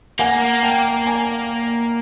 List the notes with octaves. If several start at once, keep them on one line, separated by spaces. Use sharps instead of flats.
A#3 F#5 G#5
G5 A5
G#5 A#5